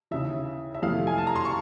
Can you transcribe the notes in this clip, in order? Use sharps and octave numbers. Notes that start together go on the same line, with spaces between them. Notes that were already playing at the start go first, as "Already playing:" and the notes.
D#2 C#3 E3 E5
E5
F2 C3 E3 A3 F5
G#5
A5
A#5
C6
C#6